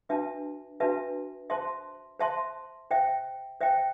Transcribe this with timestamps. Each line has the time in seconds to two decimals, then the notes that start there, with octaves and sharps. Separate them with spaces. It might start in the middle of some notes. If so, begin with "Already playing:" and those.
0.09 D4 F#4 B4 E5 A5
0.80 D4 F#4 B4 E5 A5
1.50 C5 E5 A5 C6
2.19 C5 E5 A5 C6
2.91 C5 E5 G5
3.61 C5 E5 G5